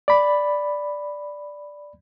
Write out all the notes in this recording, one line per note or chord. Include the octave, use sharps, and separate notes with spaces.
D5 B5